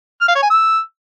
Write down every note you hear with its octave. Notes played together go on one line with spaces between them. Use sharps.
F6
F5
C#5
G#5
E6